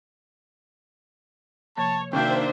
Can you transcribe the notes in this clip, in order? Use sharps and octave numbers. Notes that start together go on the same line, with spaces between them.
C3 F3 A#3 C#5 A5
C3 D#3 A#3 D4 F#4 C5 E5 G5